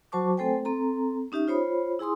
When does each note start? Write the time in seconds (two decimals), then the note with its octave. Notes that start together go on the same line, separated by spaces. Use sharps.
0.12 F#3 F#4 C5 A5 C#6 D6
0.37 A3 C4 A4 C5 G5 G#5
0.65 C4 A4 A#5
1.32 C#4 D#4 G4 E5 D#6
1.48 F4 C5 C#5 B5
1.99 E4 G#4 G#5 C6 D#6